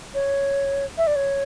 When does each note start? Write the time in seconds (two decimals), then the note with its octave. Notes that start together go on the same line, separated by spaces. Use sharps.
0.14 C#5
0.98 E5
1.07 D5
1.16 C#5